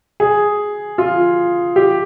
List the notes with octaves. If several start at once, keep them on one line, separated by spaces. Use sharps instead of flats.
G#4
F4
G4